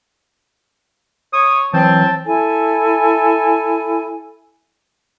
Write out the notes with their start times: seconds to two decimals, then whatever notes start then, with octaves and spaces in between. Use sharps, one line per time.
1.33 C#5 D#6
1.73 E3 F#3 C4 A5
2.25 E4 A4 G#5